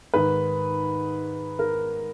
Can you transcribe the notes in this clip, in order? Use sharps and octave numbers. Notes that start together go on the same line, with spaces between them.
G#2 D#3 B4
A#4